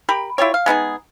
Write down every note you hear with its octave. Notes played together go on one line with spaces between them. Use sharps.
G4 A#4 B5
E4 F4 G4 C#5
F5
G#3 B3 D#4 G#4